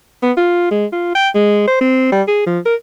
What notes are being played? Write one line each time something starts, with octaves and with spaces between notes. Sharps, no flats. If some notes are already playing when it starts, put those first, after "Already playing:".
B3
F4
G#3
F4
G5
G#3
C5
C4
G3
G#4
F3
A#4